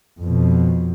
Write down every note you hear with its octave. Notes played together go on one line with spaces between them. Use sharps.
F2 B2